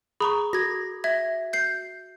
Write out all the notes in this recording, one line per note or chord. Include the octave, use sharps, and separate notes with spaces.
G#4 A#5 B5 C#6 D#6
F#4 G#6 A#6
E5 G#6 A#6
G6 C7